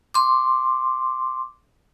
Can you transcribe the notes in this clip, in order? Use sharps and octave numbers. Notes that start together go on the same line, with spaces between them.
C6 D6